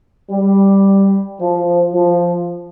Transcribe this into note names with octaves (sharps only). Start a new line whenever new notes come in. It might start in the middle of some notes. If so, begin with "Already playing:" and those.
G3
F3
F3